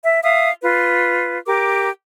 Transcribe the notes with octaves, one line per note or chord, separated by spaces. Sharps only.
E5
E5 F5 D#6
F4 B4
G4 A#4 D6